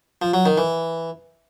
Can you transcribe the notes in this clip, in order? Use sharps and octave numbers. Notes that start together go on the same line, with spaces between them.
F3
F#3
D#3
E3